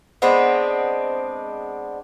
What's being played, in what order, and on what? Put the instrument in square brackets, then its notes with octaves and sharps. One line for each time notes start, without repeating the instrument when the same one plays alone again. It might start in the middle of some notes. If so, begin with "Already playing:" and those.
[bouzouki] G#3 B3 C4 D4